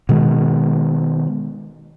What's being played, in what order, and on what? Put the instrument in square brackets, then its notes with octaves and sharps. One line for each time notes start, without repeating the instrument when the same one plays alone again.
[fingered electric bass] B2 D#3 G#3